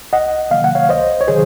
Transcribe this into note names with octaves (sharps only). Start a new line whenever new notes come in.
C2 D#5 F#5
C3 D#3 F#3 A#3 F5
F#5
C#5 F5
C2 C5 D#5
C#5
C3 D#3 F#3 G#4 C5